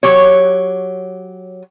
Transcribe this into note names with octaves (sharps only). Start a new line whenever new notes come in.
F#3 G4 C#5